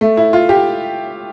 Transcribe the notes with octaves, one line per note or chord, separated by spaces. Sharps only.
A3
E4
F4
G4